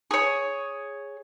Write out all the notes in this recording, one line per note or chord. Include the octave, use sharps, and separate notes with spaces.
G#4 C#5